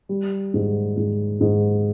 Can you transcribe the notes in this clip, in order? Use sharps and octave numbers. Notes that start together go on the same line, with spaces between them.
G3
G#2
G#2
G#2